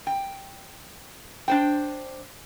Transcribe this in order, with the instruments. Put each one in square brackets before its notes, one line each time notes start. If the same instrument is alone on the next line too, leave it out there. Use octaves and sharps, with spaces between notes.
[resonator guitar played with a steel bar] G5
D4 C5 G5